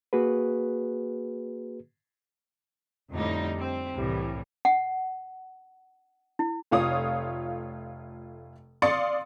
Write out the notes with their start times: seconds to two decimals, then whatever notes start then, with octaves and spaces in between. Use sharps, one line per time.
0.13 A#3 F#4 G#4 B4
3.12 F2 A2 D3 G3 D#4
3.59 C4
3.96 C2 A2 E3 G3
4.65 F#5
6.39 E4
6.71 F1 A3 F4 C#5 F5 D#6
8.82 D5 F5 C6 D#6 A6 C#7